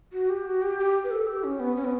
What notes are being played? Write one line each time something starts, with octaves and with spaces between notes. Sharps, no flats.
F#4
G4
F#4
G4
G4
B4
A4
G4
C#4
B3
C#4
B3